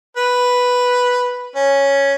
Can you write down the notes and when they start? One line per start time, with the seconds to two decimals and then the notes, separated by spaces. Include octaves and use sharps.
0.17 B4
1.56 C#4